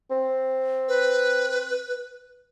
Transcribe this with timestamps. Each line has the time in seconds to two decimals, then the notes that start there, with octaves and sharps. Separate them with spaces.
0.11 C4
0.88 B4